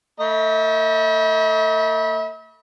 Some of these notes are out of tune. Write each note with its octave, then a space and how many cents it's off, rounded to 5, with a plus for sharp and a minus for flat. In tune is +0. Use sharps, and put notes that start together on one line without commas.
A3 +35 E5 -45 B5 -25